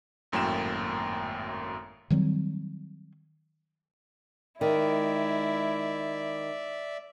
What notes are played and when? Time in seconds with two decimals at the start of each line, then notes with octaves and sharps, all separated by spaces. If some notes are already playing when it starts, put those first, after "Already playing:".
0.32 G#1 F#2 A2 A#3 G5 E7
2.10 D#3 F#3 G3 C4
4.61 D#3 G#3 E4 D5 E5